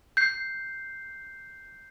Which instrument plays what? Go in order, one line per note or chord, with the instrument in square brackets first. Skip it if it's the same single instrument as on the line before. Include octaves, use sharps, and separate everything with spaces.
[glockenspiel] G6 C7